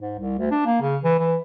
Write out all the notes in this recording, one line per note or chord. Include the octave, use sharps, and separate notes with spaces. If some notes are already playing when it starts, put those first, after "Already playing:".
G#2
C2
D2
D4
A#3
C#3
E3
E3